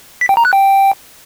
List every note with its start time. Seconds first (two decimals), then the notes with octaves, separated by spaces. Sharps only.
0.21 B6
0.29 G5
0.37 A#5
0.45 F#6
0.53 G5